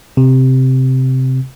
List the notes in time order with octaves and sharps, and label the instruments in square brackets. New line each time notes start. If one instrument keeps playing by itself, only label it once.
[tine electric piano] C3